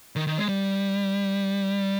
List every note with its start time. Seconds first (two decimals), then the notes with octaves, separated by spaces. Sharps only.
0.16 D#3
0.27 D#3
0.38 G#3
0.49 G3